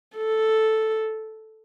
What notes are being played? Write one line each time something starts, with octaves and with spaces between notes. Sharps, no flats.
A4